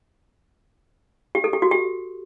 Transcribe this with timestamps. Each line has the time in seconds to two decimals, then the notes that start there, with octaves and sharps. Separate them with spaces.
1.35 G4
1.44 A4
1.53 G4
1.62 F#4
1.71 G4